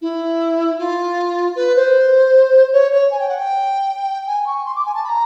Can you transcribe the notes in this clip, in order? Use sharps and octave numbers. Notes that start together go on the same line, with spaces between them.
E4
F4
B4
C5
C#5
C#5
G#5
G5
F#5
G5
G#5
C#6
C6
D6
G#5
A5
B5
A#5